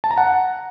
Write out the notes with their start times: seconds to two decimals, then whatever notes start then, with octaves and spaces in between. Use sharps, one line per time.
0.04 A5
0.11 A#5
0.17 F#5